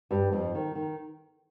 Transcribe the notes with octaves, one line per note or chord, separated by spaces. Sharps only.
G2 G3
F2 F3
D#3
D#3